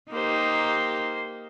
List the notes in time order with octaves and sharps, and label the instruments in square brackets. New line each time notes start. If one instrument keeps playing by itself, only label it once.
[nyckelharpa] A#3 C5 [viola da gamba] D#4 G4